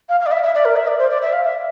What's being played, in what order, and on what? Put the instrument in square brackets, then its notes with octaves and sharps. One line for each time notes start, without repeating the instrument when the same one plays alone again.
[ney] F5
F5
D5
E5
E5
D5
A#4
E5
D5
C5
D5
E5
F5
E5